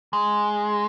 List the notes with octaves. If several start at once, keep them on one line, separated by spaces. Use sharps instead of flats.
G#3